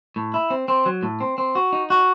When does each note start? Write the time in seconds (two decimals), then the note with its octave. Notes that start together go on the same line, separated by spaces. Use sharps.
0.16 A2
0.34 E4
0.50 C4
0.68 C4
0.86 F#3
1.03 A2
1.20 C4
1.38 C4
1.55 F#4
1.73 D#4
1.90 F#4